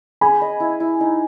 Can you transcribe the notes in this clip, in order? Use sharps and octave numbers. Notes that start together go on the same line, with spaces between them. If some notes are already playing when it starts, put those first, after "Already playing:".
G#4 G#5 B5
D#5
E4
E4
D#4